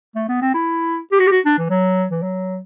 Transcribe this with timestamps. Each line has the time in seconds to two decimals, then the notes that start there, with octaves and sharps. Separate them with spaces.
0.15 A3
0.29 B3
0.42 C4
0.54 E4
1.12 G4
1.20 F#4
1.27 G4
1.31 F#4
1.45 D4
1.58 E3
1.70 F#3
2.11 E3
2.23 F#3